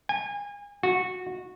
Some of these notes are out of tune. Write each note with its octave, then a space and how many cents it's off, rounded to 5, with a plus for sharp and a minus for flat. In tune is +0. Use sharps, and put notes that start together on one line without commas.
G#5 -30
F#4 -15